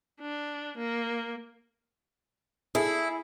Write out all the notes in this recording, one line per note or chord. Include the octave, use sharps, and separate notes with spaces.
D4
A#3
E4 G#4 A4